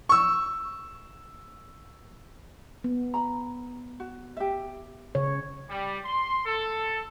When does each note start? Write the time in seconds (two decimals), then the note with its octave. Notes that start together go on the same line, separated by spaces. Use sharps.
0.09 C#6 E6
2.84 B3
3.14 A#5 B5
4.00 F#4
4.37 G4 E5
5.15 C#3 C#5
5.70 G3
6.05 C6
6.46 A4